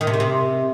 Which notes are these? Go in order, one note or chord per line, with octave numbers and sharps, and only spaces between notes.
D#3
C3
D#3
C3